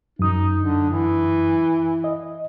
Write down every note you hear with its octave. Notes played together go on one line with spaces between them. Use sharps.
F#2 D#4 D#6
D3
E3
D#5